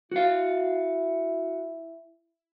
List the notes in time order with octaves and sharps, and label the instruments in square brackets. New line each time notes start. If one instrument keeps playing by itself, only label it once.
[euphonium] E4 [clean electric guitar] F#4 F5